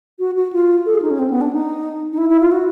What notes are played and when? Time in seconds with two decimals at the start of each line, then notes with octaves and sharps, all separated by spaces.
0.19 F#4
0.36 F#4
0.53 F4
0.86 A4
0.94 G#4
1.02 D#4
1.11 C#4
1.19 C4
1.30 B3
1.41 D4
1.53 D#4
2.13 D#4
2.18 E4
2.30 E4
2.41 F4
2.52 F#4